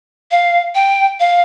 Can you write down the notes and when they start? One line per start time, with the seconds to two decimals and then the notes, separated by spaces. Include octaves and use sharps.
0.31 F5
0.75 G5
1.20 F5